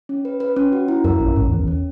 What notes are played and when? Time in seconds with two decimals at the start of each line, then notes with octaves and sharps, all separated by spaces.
0.09 C#4
0.25 B4
0.40 B4
0.56 C#4
0.72 F#4
0.88 E4
1.04 F#2 A#4
1.20 A#1 A#2 C#4
1.35 G#1 G#2 C#4
1.48 E2
1.52 C#4
1.59 E2
1.68 C#4